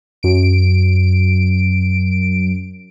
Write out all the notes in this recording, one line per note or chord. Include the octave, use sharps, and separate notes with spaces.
F#2 D7